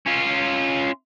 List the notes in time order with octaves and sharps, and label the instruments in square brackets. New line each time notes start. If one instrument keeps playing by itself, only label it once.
[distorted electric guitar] C#4 F4